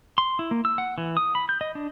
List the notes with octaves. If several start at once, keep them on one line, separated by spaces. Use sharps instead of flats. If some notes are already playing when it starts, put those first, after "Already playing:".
C6
E4
A#3
E6
F#5
E3
D#6
B5
G6
D#5
D4